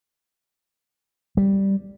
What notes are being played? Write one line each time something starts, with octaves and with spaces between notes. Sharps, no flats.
G3